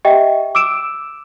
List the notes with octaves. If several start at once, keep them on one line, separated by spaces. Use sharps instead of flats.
G4 D#5 E5 G5
D6 E6 D7 E7